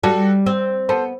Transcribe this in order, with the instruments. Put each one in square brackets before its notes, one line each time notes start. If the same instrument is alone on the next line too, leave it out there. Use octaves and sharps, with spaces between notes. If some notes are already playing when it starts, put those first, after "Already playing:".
[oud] G3 [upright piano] F#4 A4
[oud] C4
[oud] B3 [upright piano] A4 C5